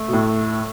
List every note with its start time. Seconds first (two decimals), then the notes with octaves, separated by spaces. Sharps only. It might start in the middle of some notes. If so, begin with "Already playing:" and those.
Already playing: A3
0.08 B2
0.13 A2